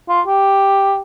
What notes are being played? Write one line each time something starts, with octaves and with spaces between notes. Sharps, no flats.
F4
G4